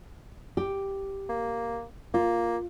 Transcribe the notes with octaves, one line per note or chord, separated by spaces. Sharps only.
G4
A#3
A#3 F4